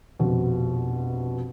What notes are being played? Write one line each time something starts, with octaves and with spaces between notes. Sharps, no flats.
F1 A#1 F2 B2